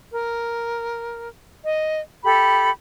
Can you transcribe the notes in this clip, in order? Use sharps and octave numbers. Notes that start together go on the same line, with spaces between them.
A#4
D#5
G4 A4 B5